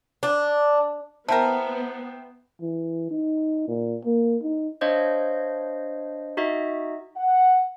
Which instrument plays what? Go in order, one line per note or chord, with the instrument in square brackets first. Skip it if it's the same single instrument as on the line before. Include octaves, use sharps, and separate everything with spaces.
[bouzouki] D4
[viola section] B3 [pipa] E4 A#4 [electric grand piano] C5 E5 G5 [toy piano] A5
[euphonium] E3
D#4
A#2
A#3
D#4
[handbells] D4 C5 C#5 D#5 F5 G6
D#4 F#4 D#5 E5
[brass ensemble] F#5